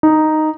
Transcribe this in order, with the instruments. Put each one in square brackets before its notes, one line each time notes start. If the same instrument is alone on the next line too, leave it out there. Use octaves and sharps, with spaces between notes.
[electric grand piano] D#4